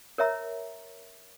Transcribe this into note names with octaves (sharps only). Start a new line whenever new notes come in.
A#4 C#5 E5 A#5